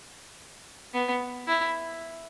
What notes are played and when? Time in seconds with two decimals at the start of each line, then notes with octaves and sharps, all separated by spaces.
0.94 B3
1.48 E4